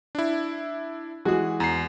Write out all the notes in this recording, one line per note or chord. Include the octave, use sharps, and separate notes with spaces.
D4 E4
E3 G#3 F#4 G#4
E2 A#5 C7